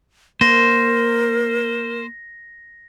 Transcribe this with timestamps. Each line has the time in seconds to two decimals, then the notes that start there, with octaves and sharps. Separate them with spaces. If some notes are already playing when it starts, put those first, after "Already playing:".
0.41 A#3 A#4 C5 A#6